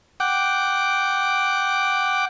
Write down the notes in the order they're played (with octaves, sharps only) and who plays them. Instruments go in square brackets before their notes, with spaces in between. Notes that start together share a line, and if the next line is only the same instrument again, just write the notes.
[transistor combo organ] F#5 G5 D6